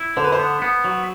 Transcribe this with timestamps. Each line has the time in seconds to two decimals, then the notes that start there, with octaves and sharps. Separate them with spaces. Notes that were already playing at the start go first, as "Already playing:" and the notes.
Already playing: E4
0.17 D3 C5
0.24 B4
0.32 C5
0.39 B3
0.62 B3
0.84 F#3